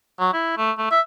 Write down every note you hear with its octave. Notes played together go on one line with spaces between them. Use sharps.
F#3
E4
A3
A3
E5